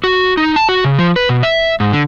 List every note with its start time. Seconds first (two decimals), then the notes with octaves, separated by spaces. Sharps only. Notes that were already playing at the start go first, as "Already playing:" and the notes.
0.04 F#4
0.37 D#4
0.56 A5
0.69 F#4
0.85 C#3
0.99 F3
1.16 B4
1.29 B2
1.43 E5
1.80 G#2
1.93 D3